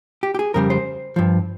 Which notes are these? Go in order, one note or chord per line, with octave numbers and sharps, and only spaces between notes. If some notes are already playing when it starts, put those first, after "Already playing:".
G4
G4
G#4
F2 C#3 G3 A#4
C5
G2 F3